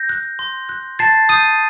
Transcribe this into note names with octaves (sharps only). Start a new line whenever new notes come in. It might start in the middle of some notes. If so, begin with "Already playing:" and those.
Already playing: G6 A#6
F#6
C6
F#6
A5 A6 C7
D#6 G6 C7 D#7